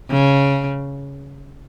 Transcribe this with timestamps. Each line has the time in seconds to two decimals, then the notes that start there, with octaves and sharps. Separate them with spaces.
0.10 C#3